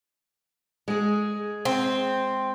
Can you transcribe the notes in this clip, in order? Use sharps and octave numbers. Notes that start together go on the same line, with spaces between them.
G#3 G#4
C4